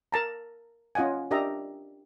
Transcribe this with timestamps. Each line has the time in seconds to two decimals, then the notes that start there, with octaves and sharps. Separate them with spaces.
0.12 A#4 A5 A#5
0.95 C#4 F4 D#5 F#5 G#5
1.31 D4 G4 A#4 D#5 E5 A#5